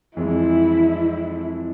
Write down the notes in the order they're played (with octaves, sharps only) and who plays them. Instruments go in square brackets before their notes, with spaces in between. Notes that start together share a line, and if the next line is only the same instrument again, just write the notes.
[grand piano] F2 E3 G#3 C4 [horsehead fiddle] E4